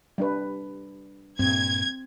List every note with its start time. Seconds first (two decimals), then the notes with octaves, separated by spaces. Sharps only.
0.18 G3 D4 B4
1.39 G2 A#2 C4 G#6